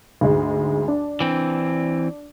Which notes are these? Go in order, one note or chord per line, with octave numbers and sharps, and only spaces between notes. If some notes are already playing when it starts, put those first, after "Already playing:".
D2 G#2 G#3
D4
E3 C4